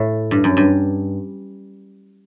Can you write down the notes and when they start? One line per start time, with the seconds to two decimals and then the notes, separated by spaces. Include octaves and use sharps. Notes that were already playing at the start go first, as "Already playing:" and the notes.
Already playing: A2
0.31 G2
0.44 F#2
0.57 G2